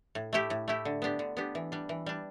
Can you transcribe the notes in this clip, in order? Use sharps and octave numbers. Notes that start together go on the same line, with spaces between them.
A2
A3 E4 G4
A2
A3 E4 G4
D3
B3 D4 G4
D3
B3 D4 G4
E3
G3 D4
E3
G3 D4